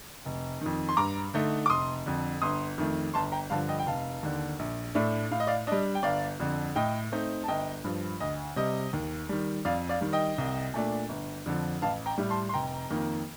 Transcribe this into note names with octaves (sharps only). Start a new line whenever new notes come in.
F1
F2 D#3
C6
G2 A#5 D6
D3 A3 D#4
D6
F1 C6 D#6
F2 D3
G1 C6 D#6
F2 D#3 A3
G1 A5 C6
G5 A#5
G2 D3 F3 F5 A5
D#5 G5
G5
F1 F5 A5
D#2 D3
A#1
A2 A3 D4
A2 F5
D#5
D5 F5
G3 D4 D#5
G5
G1 D5 F5
F2 D3
A2 D#5 G5
A3 C4 D#4
A5
G1 D#5 G5
G2 F3
D2 D#5
C3 G3 D#5
D#2
D#3 G3
F2 D5 F5
D5 F5
D#3 G3
D#5 G5
C2
A#2 A3 D4
G1
F2 D3 F3
A1 F5 A5
G5 A#5
A2 G3
A5 C6
C6
F1 G5 A#5
F2 D#3 A#3